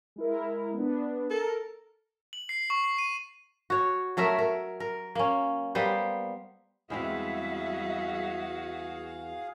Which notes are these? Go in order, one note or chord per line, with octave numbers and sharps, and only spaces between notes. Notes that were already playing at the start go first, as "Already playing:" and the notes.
G#3 E4 A#4
B3 D4
A4 A#4
F#7
C7
C#6
C7
D#7
F#4 C#5
F#3 A3 A#4 E5
A#4
A#4
A#3 C#4
G3 A#3 B3 C5
E2 G3 G#3 C4 F#4 G#4 E5 F5